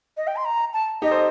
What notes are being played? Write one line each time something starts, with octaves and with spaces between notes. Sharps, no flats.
D#5
G5
C6
A#5
A5
D#4 G4 D#5
A4 C5